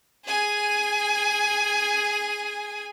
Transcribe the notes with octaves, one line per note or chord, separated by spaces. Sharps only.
G#4 G#5